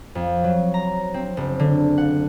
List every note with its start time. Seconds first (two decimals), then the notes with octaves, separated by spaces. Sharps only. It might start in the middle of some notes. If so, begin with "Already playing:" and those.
0.15 F2
0.44 F#3
0.74 A#5
1.14 C4
1.37 F#1
1.59 D3
1.98 F#5